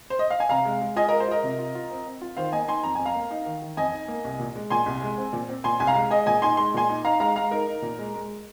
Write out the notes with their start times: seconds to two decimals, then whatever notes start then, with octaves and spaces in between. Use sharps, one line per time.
0.10 C5
0.19 D#5
0.30 F5
0.40 G#5
0.49 C3 F5 A#5
0.65 G#3
0.81 G#3
0.96 F4 D#5 G#5
1.08 A#4 D#5
1.12 G#3
1.20 C5
1.28 F4 A#4 D#5
1.43 C3
1.59 F4
1.75 F4
1.91 C4
2.06 C4
2.21 F4
2.37 D#3 C5 F5
2.52 A#3 D#5 G#5
2.68 D#4 G#5 C6
2.83 F2 A#5
2.95 F2 G#5
3.05 F5 A#5
3.15 A#3
3.31 D#4
3.46 D#3
3.62 D#3
3.77 F2 D#5 G#5
3.92 D#4
4.08 A#3
4.24 C2
4.39 A#2
4.55 G#3
4.70 A#2 G#5 C6
4.86 C2
5.02 G#3
5.18 C4
5.33 A#2
5.49 C4
5.64 A#2 G#5 C6
5.80 C2 G#5
5.87 F5 A#5
5.95 G#3
6.11 G#3 D#5 G#5
6.26 A#2 D#5 G#5
6.42 D#4 G#5 C6
6.57 G#3 C6
6.74 A#2 G#5 C6
6.89 D#4
7.04 D#4 F5 A#5
7.20 G#3 F5 A#5
7.36 G#3 F5 A#5
7.51 D#4 A#4
7.67 D#4
7.82 A#2
7.99 G#3
8.14 G#3